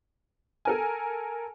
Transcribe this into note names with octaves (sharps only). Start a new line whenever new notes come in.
A4 A#4 G#5